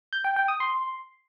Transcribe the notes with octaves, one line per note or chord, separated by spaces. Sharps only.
G6
G5
G5
D#6
C6